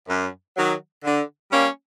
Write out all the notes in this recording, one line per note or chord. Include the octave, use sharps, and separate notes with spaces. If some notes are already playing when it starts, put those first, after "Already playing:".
F#2
D#3 F#3
D3
G3 A#3 C#4